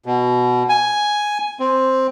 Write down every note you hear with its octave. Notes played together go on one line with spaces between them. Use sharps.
B2
G#5
C4